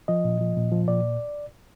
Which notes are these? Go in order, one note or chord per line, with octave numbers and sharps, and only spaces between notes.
F3 D#5
A#2
F3
A#2
F3
A#2 D5